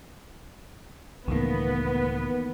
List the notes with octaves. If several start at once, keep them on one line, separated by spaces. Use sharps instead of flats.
C#2 A2 D#3 E3 A#3 B3